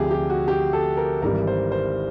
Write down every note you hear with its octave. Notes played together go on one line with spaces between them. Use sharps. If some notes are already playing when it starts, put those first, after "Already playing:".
Already playing: D2 C3 F3 G4 G#4
G4
F#4
G4
A4
A#4
G#1 G#2 E3 G3 A#4
C5
C5